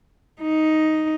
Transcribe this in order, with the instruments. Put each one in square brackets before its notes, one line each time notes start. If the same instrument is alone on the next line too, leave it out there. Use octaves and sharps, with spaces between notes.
[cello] D#4